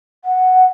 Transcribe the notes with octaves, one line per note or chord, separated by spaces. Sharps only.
F#5